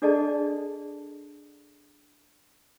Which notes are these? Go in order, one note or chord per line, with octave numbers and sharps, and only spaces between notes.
D4 G#4 A4 D5 D#5 A5